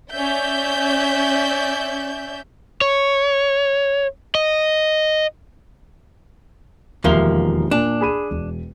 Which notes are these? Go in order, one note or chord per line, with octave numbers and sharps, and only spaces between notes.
C#4 D5 E5 G6
C#5
D#5
E1 D#2 F3 A#3 E5 G7
A#2 D4
G#4 B5 D#7
E1